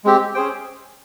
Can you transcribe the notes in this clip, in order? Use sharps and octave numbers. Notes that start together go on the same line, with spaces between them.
G#3 C4 G4
C#4 G#4 C5 G5